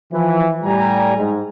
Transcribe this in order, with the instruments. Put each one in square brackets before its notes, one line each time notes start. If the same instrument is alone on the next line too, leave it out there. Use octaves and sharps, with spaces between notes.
[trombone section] E3 [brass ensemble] F3
[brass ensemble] A2 G#5 A#5 [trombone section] G3
[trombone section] G#2